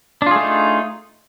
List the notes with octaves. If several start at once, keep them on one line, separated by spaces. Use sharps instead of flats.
A3 D4 D#4 F4 G#4